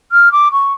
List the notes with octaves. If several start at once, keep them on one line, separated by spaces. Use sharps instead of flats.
F6
D6
C#6